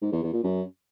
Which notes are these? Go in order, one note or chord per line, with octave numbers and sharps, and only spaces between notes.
G#2
E2
E2
A#2
F#2